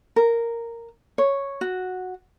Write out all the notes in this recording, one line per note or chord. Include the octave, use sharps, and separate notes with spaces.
A#4
C#5
F#4